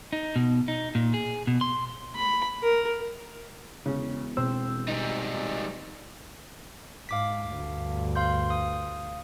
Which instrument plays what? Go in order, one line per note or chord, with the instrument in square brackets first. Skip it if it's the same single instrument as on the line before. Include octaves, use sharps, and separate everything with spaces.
[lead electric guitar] D#4
B2
D#4
A#2
G#4
B2
C6
[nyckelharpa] B5
A#4
[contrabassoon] E1 [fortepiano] C#3
[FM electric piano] B2 E6 [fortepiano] C4
[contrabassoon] G#1 [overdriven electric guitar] G3 D#4
[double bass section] G#2 [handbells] F5 D6 B6
[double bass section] D2 G2
[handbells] F5 C6 G6
F5 D#6